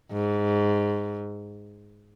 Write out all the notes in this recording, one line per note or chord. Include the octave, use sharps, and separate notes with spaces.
G#2